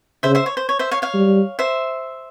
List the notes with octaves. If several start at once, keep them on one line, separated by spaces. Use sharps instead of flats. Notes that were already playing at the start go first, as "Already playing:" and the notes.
C#3 C5 E5
C5 E5
C#5
C5
C#5
C5 E5
C#5 F5
C#5 F5
G3
C5 E5